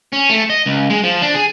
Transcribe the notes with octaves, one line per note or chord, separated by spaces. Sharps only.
C#4
A3
D#5
C#2
G#3
F3
D4
G#4